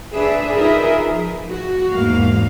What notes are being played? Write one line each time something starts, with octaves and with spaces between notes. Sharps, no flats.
D4 G#4 B4 C5 E5
D#4 F4 G#4 A#4 B4 E5
F3
F#4
E2 G#2 A#3 F5